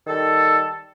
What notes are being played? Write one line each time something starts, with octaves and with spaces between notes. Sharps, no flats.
D#3 G3 A4